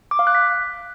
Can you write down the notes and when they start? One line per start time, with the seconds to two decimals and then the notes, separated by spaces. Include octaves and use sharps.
0.11 D6
0.19 F5
0.27 F#6
0.35 B6